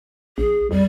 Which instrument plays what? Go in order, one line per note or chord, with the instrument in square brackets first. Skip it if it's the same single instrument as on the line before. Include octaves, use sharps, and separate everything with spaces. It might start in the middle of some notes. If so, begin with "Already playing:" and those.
[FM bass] A#1 [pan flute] G#4
[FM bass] F2 [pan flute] G3